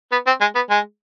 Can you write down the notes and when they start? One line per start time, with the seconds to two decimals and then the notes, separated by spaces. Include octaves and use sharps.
0.12 B3
0.26 C4
0.41 G#3
0.55 B3
0.70 G#3